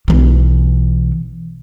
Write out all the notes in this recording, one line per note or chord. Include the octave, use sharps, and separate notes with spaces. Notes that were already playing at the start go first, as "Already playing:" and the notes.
B1 E3